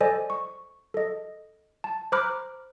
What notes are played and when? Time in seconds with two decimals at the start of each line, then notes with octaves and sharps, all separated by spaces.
0.01 A4 C5 D5 D#5 G#5
0.30 C#6
0.94 A4 D#5
1.84 A5
2.12 C5 A#5 B5 D6 F6 F#6